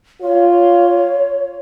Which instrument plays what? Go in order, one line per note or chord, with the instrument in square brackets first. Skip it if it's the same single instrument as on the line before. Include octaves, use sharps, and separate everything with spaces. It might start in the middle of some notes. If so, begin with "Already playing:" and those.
[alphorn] F4 [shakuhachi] C#5